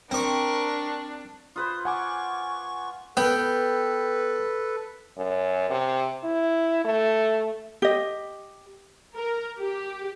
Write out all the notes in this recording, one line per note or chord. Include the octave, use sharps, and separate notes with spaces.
C4 D4 A#4 C#6 D6
F4 B4 C5 D#6
F#5 G#5 C#6 D6
B3 A4 B4 G5
F#2
C3
E4
A3
G4 D#5
A#4
G4